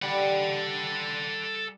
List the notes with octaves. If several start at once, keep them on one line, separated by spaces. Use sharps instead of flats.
G3 A4 F#5